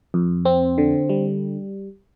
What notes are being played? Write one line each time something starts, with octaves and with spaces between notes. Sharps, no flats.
F2
C4
D3
G3